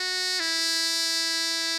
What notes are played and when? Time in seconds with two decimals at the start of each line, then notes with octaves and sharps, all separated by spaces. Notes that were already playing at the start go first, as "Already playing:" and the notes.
Already playing: F#4
0.40 E4